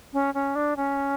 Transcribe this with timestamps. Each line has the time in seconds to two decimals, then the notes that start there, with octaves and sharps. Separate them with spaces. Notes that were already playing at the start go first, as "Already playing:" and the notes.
0.13 C#4
0.34 C#4
0.55 D4
0.77 C#4